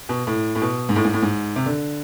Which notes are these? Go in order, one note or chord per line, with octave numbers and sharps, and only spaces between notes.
B2
A2
A2
B2
G#2
A2
G#2
A2
G#2
C3
D3